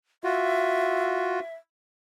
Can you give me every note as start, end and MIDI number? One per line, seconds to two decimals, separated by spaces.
0.24 1.40 65
0.24 1.40 66
0.24 1.54 76